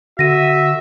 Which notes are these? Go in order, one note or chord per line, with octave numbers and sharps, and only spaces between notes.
D3 F#4 E5 A#6 D#7